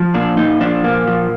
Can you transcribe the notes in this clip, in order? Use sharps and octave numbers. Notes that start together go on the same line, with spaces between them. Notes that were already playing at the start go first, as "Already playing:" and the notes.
Already playing: F3
A#2 D4
A#2 D#4
F3 D4
A#2 A#3
F3